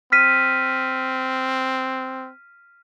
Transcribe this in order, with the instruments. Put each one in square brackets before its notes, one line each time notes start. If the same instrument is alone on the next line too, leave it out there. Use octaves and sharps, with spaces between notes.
[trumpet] C4 [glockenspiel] F6 B6 D#7